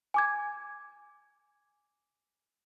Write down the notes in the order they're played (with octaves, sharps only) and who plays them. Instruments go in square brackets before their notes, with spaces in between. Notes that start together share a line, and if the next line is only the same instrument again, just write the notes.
[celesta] G#5 D6 G#6